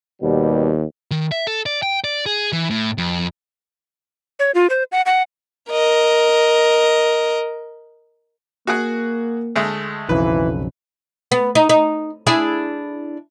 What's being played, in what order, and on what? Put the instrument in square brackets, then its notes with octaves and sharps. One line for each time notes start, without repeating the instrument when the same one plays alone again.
[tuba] D#2 [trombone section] B2 G3
[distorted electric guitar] D#3
E5
A4
D5
G5
D5
G#4
E3
A2
F2
[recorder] C#5
F4
C5
F#5
F#5
[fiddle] A#4 D#5
[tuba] A#3 [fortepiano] F#4 G#4 F#5
[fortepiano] D2 G#3 A3
[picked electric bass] B1 F2 C#3 [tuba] E3 [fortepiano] B4
[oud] B3
D#4
D#4
D4 E4 G#4